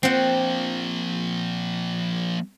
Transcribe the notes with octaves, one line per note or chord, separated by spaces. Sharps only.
F3 A#3 C4 F#5